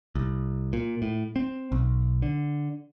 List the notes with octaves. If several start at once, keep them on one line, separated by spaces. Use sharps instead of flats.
C2
A#2
A2
C4
B1
D3